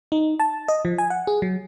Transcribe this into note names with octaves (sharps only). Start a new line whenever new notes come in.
D#4
A5
D#5
F3
G#5
F#5
G#4
F#3